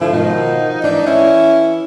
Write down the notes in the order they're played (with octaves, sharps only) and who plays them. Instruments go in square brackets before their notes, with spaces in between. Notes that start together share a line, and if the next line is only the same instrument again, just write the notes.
[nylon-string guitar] D3 [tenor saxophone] F3 [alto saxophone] E4
[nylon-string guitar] B2 D#3 [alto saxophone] D#4
[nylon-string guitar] E3 [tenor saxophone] D4
[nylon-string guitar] E3 [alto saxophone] C#4 [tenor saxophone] E4